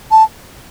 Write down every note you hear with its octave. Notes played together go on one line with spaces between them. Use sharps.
A5